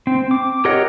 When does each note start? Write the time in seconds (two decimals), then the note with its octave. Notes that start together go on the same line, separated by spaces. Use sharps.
0.07 C4
0.31 D6
0.65 G4 A#4 C#5 D#5 F#5